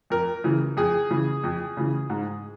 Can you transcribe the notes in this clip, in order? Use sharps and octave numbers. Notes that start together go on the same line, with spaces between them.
F2 A#4
C#3 E3
F2 G#4
C#3 E3
F2
C#3 E3
G#2